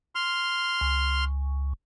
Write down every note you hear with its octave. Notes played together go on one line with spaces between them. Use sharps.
C6 F6
C#2